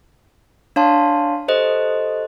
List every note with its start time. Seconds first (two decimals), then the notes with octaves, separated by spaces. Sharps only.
0.76 D4 C#5 F5 A5 C6
1.48 G4 A4 C5 D#5